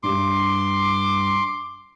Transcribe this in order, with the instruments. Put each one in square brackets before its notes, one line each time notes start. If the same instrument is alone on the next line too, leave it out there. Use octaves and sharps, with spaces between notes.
[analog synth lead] G2 [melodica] C6 D6